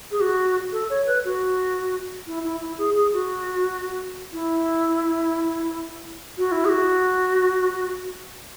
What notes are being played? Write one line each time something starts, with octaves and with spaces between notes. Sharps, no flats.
G#4
F#4
A4
C#5
B4
F#4
E4
E4
E4
G#4
G#4
F#4
E4
F#4
E4
G#4
F#4